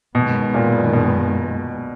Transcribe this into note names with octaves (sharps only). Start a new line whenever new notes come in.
F#2 B2 D#3 G#3 B3
A#2
B2